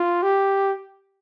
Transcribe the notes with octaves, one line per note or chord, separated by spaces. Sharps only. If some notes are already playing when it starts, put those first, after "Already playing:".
Already playing: F4
G4